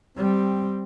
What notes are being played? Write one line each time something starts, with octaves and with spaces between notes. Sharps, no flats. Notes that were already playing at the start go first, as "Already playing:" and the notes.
G3 C4